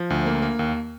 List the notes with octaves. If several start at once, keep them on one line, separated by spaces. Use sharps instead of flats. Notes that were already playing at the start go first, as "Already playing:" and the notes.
Already playing: F3
D2
A#3
A#3
D#2